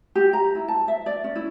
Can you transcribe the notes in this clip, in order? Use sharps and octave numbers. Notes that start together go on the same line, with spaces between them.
G4
A#5
E4
A5
E5
D5
C#4
E4